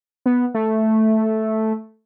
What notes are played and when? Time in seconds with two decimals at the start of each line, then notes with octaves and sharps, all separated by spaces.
0.26 B3
0.54 A3